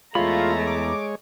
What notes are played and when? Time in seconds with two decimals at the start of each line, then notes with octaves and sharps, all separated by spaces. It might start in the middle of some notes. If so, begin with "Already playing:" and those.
0.15 E2 G#3 A3 F4 C#5 A#5 B5
0.67 D6